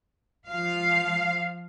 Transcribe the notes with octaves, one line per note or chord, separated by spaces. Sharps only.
F3 F5